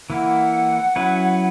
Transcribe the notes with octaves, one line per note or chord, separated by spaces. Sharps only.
E3 A#3 E4 F#5
F#3 C#4 E4 B4